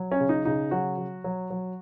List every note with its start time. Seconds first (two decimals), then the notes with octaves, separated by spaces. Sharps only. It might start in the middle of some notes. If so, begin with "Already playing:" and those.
Already playing: F#3
0.12 C#4
0.20 C#3
0.29 D#4
0.45 C#3 D#4
0.71 F#3 F#4
0.98 F#3
1.24 F#3
1.50 F#3